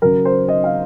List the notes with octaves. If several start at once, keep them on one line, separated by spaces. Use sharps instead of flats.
C#3 F#3 A#4
C5
D#5
F5